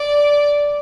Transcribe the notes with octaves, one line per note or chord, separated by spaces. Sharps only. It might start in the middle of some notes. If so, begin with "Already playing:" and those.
Already playing: D5